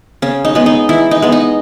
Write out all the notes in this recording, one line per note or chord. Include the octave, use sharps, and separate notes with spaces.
C#3 C#4
D#4
G#3 B3
D#4
E3 E4
D#4
G#3 B3
D#4